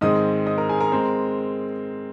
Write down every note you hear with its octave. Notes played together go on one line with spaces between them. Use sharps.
G#2 D#3 G#3 C4 D#5 D#6
D#5 D#6
A#4 A#5
G#4 G#5
A#4 A#5
G#3 C4